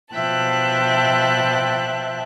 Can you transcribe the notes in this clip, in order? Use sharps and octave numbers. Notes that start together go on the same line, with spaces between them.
B2 F3 E5 G5 A5 F#6